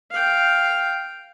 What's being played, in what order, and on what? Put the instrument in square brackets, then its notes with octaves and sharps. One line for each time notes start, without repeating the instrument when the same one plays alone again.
[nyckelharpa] F5 G5